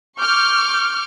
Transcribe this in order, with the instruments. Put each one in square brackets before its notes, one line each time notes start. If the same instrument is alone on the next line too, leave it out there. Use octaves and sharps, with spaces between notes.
[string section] C#6 D6 F6 G6